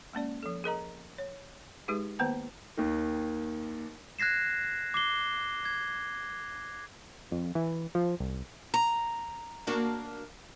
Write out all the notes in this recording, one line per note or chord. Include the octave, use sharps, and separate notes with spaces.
G#3 A#3 C#4 D5
F3 A4
G#4 A#4 D#5 A#5
C#5
G#3 D#4 G4 G#4 B4
D#3 A#3 B3 B4 C5 A5
D#2 D#3
F#6 G#6 A#6 C7 E7
D6 C7 G7
G#6
F2
E3
F3
C2
A#5
A#3 D4 F#4